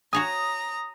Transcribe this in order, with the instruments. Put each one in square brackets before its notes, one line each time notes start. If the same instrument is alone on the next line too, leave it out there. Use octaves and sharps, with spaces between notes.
[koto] F#4 C#5 G#5 [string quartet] A#5 [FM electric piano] D#6